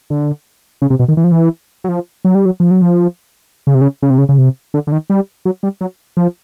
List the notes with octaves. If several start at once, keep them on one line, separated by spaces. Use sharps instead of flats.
D3
C#3
C3
B2
D#3
E3
F3
E3
F#3
F3
F#3
G3
F#3
F3
F#3
F3
C#3
C3
C#3
C#3
C3
C#3
C#3
C3
D3
D3
D#3
G3
F#3
G3
F#3
F3